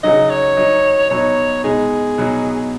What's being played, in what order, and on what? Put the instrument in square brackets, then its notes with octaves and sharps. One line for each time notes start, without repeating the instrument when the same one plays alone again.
[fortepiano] C#3 F#3 D#4 [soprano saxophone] D#5
[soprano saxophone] C#5
[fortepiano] F#3 D#4
[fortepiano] B2 F#3 D#4 [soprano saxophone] C#5
[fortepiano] B2 G#3 D#4 [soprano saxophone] G#4
[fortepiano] B2 F#3 D#4